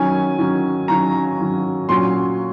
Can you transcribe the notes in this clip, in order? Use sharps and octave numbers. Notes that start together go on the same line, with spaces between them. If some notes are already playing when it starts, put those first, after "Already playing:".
Already playing: D#3 F#3 C#4 G#5
D#3 F#3 C#4
D#3 F#3 C#4 A#5
D#3 F#3 C#4
A#2 F#3 C#4 C6